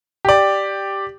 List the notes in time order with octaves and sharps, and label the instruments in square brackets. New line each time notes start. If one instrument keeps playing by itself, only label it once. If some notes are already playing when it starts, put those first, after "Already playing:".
[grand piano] G4 D5